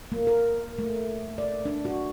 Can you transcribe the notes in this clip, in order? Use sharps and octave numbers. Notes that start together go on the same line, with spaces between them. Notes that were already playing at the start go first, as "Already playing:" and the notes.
A#3
A#4
A3
D5
D4
F#4